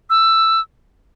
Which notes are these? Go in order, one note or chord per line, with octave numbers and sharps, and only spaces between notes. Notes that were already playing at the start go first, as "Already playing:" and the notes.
E6